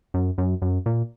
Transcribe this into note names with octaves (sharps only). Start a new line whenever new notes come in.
F#2
F#2
F#2
A#2